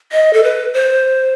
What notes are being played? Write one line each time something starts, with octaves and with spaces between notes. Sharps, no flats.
D#5
A4
B4
C5